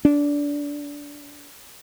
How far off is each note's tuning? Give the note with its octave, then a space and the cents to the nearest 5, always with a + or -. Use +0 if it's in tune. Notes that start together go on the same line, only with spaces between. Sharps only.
D4 -20